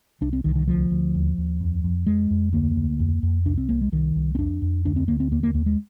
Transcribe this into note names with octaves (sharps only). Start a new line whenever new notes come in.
C2 D4
C4
C2 D#3
D#3
D2 F3
D2
D#2
D#2
F2
F2
F2 G#3
F2
D2 A#3
D2
F2
F2
C2 D4
C4
C2 A#3
G#3
C2 D#3
C2
C4
F2 D4
F2
D2 D4
C4
D2 A#3
C4
D#2 A#3
A#3
D#2 A#3
G#3